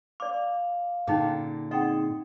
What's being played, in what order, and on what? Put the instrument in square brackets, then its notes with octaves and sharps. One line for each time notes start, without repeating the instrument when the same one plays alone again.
[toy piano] D5 D6 [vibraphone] F5
[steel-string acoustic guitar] A#2 D3 [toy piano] C#4 D#4 G#4
[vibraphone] C4 D#4 G#4 [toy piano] D#5 F#5 G5